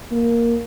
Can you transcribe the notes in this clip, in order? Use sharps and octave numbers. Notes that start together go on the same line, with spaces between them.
A#3